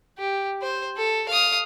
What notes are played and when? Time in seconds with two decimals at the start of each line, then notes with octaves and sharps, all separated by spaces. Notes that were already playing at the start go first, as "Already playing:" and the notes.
0.18 G4
0.62 C5
0.97 A4
1.29 F5 D#6